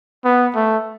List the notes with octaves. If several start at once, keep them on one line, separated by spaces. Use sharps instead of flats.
B3
A3